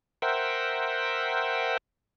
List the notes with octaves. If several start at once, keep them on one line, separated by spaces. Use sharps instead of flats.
A#4 C5 E5 F#5 G5